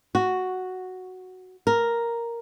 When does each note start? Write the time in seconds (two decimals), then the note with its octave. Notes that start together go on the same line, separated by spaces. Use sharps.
0.15 F#4
1.67 A#4